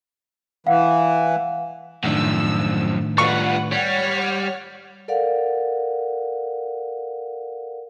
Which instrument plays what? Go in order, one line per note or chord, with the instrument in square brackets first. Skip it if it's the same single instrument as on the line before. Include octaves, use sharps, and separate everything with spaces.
[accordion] E3 [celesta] F5 F#5
[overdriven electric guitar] F#2 F3 [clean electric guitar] A2 D#3 D4 [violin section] E6
[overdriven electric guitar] G3 F4 [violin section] B4 F#5 [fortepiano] C#6
[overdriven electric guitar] G3 [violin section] C#5 F#5 F6
[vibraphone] A4 A#4 D5 F5 F#5